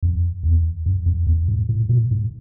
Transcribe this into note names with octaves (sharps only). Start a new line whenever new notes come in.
F2
E2
F#2
F2
E2
G#2
A2
A#2
G#2